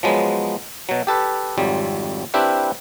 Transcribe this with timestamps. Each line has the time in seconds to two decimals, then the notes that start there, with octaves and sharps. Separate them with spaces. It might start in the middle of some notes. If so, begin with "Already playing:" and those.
0.03 F3 F#3 G#3 B3
0.89 B2 F#3
1.07 G4 A4 B4
1.58 G#1 F2 F#3 G3
2.34 C4 D4 E4 G4 B4 G5